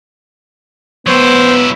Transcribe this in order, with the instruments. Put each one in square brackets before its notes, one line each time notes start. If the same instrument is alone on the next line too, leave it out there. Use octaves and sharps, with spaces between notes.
[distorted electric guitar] F#3 E4 [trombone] B3 [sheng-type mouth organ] C5